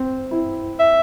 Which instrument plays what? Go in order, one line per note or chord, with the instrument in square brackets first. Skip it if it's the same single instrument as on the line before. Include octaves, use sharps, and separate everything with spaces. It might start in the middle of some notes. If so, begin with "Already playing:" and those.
Already playing: [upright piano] C4
E4
[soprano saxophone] E5